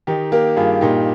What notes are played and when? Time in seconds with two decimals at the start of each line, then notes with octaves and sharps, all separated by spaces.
0.07 D#3 D#4 G4
0.32 A#3 G4 A#4
0.56 G2 F4 G#4
0.81 A#2 D#4 G4